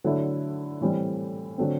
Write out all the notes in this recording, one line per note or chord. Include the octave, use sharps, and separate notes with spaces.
D3 F#3 A3 E4
A2 E3 G3 C4
D3 F#3 A3 C4